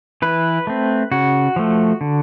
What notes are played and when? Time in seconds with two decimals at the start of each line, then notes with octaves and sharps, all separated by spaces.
0.22 E3 B4
0.67 A3 C4
1.11 C#3 F#4
1.56 F3 A3
2.01 D3